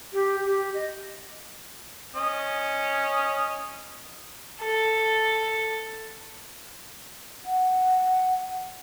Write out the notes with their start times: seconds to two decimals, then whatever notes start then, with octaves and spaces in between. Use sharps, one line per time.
0.13 G4
0.46 G4
0.74 D#5
2.15 C#4 D#5
4.61 A4
7.46 F#5